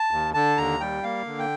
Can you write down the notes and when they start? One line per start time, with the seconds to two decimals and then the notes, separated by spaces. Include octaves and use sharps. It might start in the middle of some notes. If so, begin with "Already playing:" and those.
Already playing: A5
0.11 D#2
0.34 D3 A5
0.57 D#2 A#5
0.80 G3 G5
1.03 A#3 F5
1.27 D3
1.39 G5